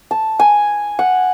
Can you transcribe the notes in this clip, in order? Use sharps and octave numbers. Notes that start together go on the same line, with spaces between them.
A5
G#5
F#5